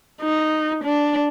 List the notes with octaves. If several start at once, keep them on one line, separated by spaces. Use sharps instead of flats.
D#4
D4